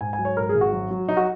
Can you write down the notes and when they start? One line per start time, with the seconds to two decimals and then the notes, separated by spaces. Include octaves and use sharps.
0.01 G#2 G#5
0.13 G#5
0.19 F#3
0.25 C#5
0.37 G#2 A#4
0.49 G#4
0.55 G#1
0.61 F#4
0.73 F#3
0.91 F#3
1.08 F#3 D#4
1.17 F#4